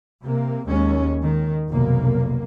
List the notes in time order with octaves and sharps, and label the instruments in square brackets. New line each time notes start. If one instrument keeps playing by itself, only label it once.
[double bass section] C3 A#3
D#2 G#3 C#4
D#3
F1 B1 A#3